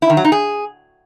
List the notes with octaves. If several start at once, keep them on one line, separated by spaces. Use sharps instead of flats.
E4
D#3
F#3
D#4
G#4